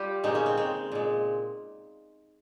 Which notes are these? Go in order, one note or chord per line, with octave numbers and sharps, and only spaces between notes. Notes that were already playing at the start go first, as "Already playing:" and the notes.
Already playing: G3 F4 G4
A#2 G#3 C4 D#4
A#3 C#4
C4
C#3 G#3 C4
A#2 G#3